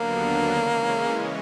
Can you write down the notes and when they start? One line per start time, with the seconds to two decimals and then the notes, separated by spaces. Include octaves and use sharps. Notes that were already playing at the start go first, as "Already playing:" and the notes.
Already playing: D#2 D3 F#3 A#3 B3 D4
0.56 C#3 E3 G#3 C#4